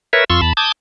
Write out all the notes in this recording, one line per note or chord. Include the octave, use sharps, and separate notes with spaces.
A#4 B4 C#5 E5
F2 F4 C6 C#6 E6
E2 A5 B5
A5 D6 D#6 G6 G#6